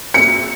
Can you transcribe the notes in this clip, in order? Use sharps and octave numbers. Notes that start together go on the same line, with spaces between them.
C#7